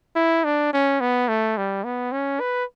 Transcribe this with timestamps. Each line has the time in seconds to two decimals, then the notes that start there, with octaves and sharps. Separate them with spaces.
0.16 E4
0.44 D4
0.73 C#4
1.00 B3
1.28 A3
1.57 G3
1.84 B3
2.12 C#4
2.40 B4